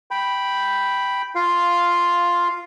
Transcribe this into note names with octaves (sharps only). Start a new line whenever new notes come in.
G5 B5
F4 F5